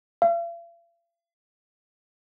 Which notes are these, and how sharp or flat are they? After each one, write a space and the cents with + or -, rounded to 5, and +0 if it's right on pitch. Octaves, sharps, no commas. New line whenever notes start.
F5 -45